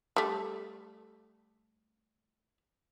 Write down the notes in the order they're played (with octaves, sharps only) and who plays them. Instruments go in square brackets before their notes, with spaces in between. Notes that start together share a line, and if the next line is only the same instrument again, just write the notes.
[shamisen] G3 A3